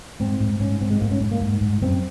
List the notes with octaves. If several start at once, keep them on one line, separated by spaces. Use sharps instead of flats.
G#2 C4
G#2
G#2 C#4
G#2 C4
G#3
G#2 A#3
C#4
G#2
A#3
G#2
G#2
F#2 C4